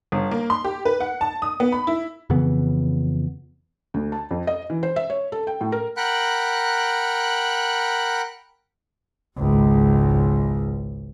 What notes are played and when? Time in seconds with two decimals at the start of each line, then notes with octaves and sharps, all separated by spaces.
0.12 G1
0.31 A#3
0.50 C6
0.64 G4
0.85 B4
1.00 F#5
1.21 A5
1.42 D#6
1.60 B3
1.72 B5
1.87 E4
2.30 F2 C#3 E3 B3
3.94 D2
4.12 A5
4.31 F2
4.47 D#5
4.70 E3
4.83 C5
4.96 E5
5.10 C#5
5.32 A4
5.47 G5
5.61 A2
5.72 A#4
5.97 A#4 F#5 G5 B5 F#6
9.37 G#1 C#2